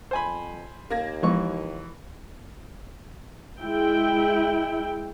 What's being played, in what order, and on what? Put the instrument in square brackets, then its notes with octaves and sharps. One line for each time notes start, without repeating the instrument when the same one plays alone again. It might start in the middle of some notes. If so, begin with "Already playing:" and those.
[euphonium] F2 [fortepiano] C5 G#5 B5
[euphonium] D#2 [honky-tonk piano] A#3 G#6 A#6
[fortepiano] E3 C#6 [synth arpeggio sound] F3 G#3 B3
[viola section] G#3 E4 G5